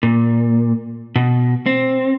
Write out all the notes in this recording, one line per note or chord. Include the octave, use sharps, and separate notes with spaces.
A#2
B2
C4